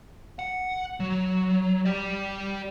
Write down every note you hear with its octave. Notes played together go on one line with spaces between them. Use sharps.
F#5
F#3
G4 D5